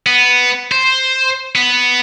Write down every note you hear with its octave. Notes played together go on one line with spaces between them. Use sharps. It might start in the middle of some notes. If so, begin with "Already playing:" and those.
B3
C5
B3